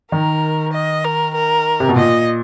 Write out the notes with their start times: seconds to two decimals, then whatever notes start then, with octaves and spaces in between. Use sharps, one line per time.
0.12 D#3 A#4
0.73 D#5
1.04 A#4
1.35 A#4
1.80 C3
1.89 B2
1.96 A#2 D#5